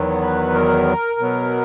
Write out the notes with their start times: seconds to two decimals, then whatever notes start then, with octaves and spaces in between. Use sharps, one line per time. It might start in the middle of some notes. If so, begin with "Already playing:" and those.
Already playing: E2 D#3 F#3 B3
0.22 B4
0.54 A#4
1.19 B2 F#3 B3